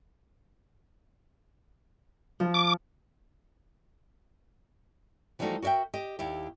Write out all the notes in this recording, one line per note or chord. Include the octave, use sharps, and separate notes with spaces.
F3
D6
E3 F3 G3 A3 D#4 F#4
F#4 A#4 C#5 E5 G5
G4 D#5
D#2 E4 G4